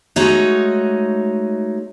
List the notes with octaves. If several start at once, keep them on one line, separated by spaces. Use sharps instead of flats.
G#3 A3 D#4 F#4 C#5 D#5